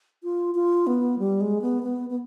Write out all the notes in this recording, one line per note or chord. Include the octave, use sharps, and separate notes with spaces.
F4
F4
B3
G3
G#3
B3
B3
B3